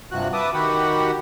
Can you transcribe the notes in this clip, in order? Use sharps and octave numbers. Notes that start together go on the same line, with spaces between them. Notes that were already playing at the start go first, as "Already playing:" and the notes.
G2 C3 F3 F#4 F#6
B4 E5 A5 D6 D#6
D#3 F#4 G4 F#5 B5